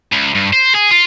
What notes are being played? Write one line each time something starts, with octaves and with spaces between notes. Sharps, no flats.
C#2
G2
C5
G#4
F4